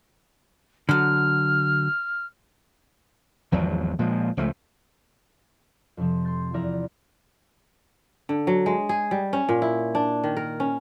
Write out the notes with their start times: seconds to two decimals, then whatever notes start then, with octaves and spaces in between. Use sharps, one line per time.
0.89 D3 F#3 F6
3.52 G#1 E2 F3 F#3
3.99 A#2 F3 G#3
4.37 C#2 F3 A3
5.97 F2 C3 F3
6.25 C6 G6 A6
6.54 E2 F3 E4 D5 A#5 F6
8.29 D3
8.47 F#3
8.66 G#3
8.89 G#4
9.11 G3
9.33 C#4
9.49 A#2
9.62 E4
9.95 D4
10.24 D#3
10.37 A#4
10.60 C#4